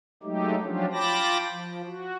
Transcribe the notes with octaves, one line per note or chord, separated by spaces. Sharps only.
F#3 G#3 A3 D#4 G4
F3 F#3 C#4 D4 F4 G4
F4 G5 A5 B5 D6 A#6
F3
F#4